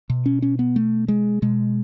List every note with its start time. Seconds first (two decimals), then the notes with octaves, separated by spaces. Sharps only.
0.10 B2
0.26 C#4
0.42 C#4
0.59 B3
0.76 A3
1.08 G#3
1.42 B2 G#3